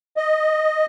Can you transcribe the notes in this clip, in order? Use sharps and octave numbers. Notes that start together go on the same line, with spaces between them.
D#5